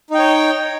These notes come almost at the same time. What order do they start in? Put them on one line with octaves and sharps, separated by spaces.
D#4 G5 C#5